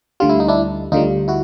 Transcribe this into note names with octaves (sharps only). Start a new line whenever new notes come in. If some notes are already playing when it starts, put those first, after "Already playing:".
D2 D3 G3 F4
E4
D#4
D4 E4
D2 D3 G3 D#4 F4
E4 F#4